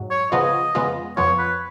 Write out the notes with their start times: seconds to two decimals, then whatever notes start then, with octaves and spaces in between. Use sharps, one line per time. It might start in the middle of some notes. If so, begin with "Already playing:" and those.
Already playing: G#2 F#3
0.10 C#5
0.32 C#2 C#3 F3 B3 F4 D#5
0.75 F2 C#3 G#3 B3 F4
1.17 F2 F3 B3 F4 C#5
1.38 B4